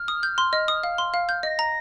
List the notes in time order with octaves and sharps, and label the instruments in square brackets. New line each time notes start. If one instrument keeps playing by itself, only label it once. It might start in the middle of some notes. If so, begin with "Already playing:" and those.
Already playing: [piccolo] F6
[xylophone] D#6
G6
C6
D#5
D#6
F5
C6
F5
G6
[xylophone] D#5 [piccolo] A#6
[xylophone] A#5